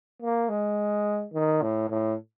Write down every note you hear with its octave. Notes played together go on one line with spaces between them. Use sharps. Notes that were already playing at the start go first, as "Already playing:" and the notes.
A#3
G#3
D#3
A2
A2